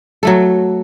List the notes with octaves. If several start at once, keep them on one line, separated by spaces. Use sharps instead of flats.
F#3 A3 A4